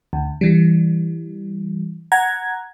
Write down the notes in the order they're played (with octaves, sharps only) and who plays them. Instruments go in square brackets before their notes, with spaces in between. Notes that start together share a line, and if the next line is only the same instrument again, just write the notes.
[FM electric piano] D2
E3 G3
F#5 A#5 G#6